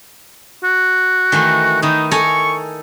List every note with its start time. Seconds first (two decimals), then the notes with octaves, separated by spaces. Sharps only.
0.63 F#4
1.32 D#3 E3 A3
1.82 D#3 D#4 E4
2.11 A4 G#5 A#5 C#6